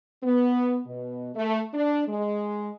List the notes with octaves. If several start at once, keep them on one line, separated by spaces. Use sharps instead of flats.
B3
B2
A3
D4
G#3